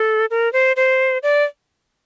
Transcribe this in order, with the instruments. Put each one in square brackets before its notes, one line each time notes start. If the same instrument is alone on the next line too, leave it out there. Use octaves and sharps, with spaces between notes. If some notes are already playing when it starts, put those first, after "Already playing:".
Already playing: [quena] A4
A#4
C5
C5
D5